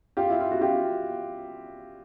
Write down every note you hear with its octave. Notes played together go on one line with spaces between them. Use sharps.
F4 G4
E4
F4
F#4
F4 G4